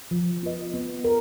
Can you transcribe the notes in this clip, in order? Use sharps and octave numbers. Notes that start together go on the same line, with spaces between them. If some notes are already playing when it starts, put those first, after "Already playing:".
F3
B3 F4 B4 D#5
B3
A#4